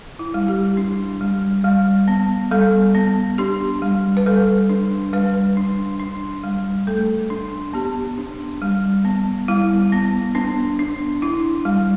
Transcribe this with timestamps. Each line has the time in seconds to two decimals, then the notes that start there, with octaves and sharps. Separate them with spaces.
0.19 E4
0.34 G3
0.48 G4
0.77 D4
1.21 G3
1.64 G3
2.08 B3
2.51 G3 A4
2.95 B3
3.38 D4 G4
3.82 G3
4.17 B4
4.26 G3 A4
4.69 D4
5.13 G3 B4
5.57 D4
6.00 D4
6.44 G3
6.87 A3 A4
7.30 D4
7.73 B3 G4
8.18 D4
8.62 G3
9.05 B3
9.48 G3 E4
9.92 B3
10.35 B3 D4
10.79 D4
11.22 D4 E4
11.65 G3